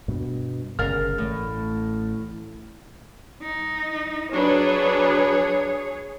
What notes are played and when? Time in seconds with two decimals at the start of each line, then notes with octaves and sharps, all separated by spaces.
0.08 G2 B2
0.79 G1 C#3 A#4 F5 F6 A6
1.18 A1 A2
3.42 D#4
4.32 F#3 D4 G#4 B4 C#5